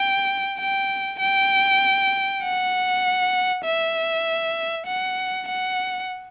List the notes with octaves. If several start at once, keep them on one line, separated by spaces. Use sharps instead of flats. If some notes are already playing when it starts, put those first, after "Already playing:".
Already playing: G5
G5
G5
F#5
E5
F#5
F#5